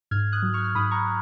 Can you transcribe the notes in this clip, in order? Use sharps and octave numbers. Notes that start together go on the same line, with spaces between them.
G#2 F6 G#6
D#6 F#6
F#3
C#6 F6
F6
G#2 B5 D#6
A#5 C#6